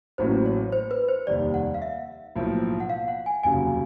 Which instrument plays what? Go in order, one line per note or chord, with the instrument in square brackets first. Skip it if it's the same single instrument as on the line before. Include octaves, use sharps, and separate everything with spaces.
[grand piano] A1 A2 F#3 A#3 C#4 [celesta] C5
[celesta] C#5
C5
B4
C5
[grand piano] F1 D#2 D#3 G3 [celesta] D5
[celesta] F#5
F5
E5
[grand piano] B1 A2 F3 A#3
[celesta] F#5
F5
F#5
G#5
[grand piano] F1 D#2 C#3 F#3 [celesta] G#5